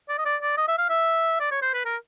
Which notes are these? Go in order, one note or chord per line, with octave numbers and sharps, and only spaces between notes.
D5
D#5
D5
D5
D#5
E5
F5
E5
D5
C#5
C5
B4
A#4